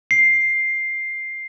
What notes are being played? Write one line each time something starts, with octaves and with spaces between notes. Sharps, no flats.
C7